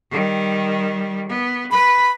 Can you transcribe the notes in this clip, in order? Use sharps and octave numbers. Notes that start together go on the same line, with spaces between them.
D#3 G3
B3
B4 B5